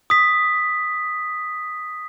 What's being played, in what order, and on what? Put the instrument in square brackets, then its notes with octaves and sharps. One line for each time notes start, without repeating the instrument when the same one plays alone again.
[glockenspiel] D#6 B6